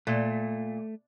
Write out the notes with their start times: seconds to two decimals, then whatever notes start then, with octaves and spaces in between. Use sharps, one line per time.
0.07 A#2 A3